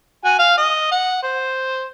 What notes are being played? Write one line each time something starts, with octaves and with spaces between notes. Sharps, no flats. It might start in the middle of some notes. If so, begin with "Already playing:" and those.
F#4 G#5
F5
D#5
F#5
C5